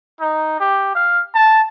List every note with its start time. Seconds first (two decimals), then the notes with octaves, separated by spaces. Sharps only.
0.21 D#4
0.60 G4
0.95 F5
1.35 A5